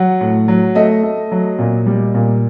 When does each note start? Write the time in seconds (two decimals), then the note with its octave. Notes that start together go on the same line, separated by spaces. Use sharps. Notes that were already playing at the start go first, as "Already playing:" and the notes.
Already playing: F#3 F#5
0.21 A2
0.48 F#3
0.75 A3 D#5
1.03 A3
1.32 F#3
1.59 A#2
1.86 G3
2.15 A#2